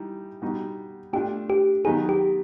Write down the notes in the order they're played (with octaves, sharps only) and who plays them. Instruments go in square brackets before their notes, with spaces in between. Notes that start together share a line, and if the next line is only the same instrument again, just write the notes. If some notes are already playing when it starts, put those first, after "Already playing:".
Already playing: [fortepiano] E3 G3 D#4
G3 B3 D#4 F#4
[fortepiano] A3 D4 F4 [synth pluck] G4
[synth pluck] G4
[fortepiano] D#3 F#3 B3 D#4 [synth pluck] G#4
[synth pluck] G4